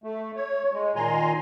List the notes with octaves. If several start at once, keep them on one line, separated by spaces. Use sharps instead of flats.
A3
C#5
G#3
A#2 D#3 G#5 A#5 C6